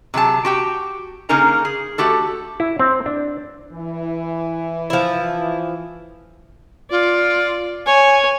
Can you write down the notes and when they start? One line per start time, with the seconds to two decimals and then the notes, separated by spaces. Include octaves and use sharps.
0.14 C3 F#3 G#4 A5
0.45 F#4 G4 G5
1.29 C#3 A#3 D#4 A#4 G#5 A#5
1.65 G#4
1.98 A3 F#4 G4 A4
2.60 E4
2.79 C4
3.06 D4
3.72 E3
4.90 F3 E4
6.91 F4 D5
7.86 C#5 G#5